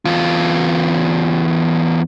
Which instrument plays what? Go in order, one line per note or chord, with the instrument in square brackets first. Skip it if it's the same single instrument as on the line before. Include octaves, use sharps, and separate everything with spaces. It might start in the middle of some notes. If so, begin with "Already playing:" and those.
[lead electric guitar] E2 F4